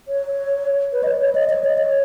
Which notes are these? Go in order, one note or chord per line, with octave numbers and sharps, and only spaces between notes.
C#5
B4
D#5
C#5
C#5
D#5
C#5
D#5
C#5